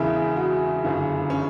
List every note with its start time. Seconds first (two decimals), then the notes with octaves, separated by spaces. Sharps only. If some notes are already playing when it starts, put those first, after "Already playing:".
Already playing: E1 E2 C#3 E4
0.36 F#4
0.83 G1 F#2 C#3 E3
1.30 C#4